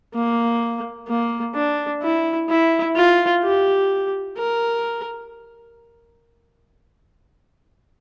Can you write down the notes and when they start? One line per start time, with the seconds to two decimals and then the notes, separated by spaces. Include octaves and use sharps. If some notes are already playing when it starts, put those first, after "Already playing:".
0.14 A#3
1.08 A#3
1.55 D4
2.02 E4
2.49 E4
2.96 F4
3.43 G4
4.37 A#4